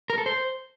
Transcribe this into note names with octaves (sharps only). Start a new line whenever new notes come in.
A#4
A4
C5